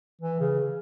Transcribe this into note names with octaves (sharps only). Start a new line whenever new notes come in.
E3
C#3